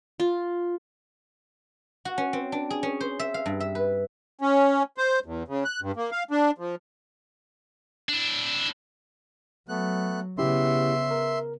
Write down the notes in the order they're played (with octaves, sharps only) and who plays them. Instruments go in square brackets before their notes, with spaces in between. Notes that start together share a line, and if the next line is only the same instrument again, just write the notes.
[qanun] F4
[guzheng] F#4
C#4
C4
D4
G#4
C#4
C5
E5
F5
G2
E5
B4
[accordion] C#4
C5
E2
C#3
F#6
G2
A#3
F5
D4
F3
[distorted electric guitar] D4 E4
[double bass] F#3 [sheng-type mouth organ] A3 B3 F#6
[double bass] C#3 B3 [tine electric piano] C#4 E4 G4 [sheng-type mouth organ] E5 C6
[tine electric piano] A#4